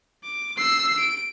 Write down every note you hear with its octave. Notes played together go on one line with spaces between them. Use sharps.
D6
E6 C7
D7